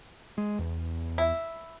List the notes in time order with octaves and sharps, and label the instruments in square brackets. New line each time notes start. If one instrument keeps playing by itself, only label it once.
[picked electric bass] G#3
E2
[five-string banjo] E4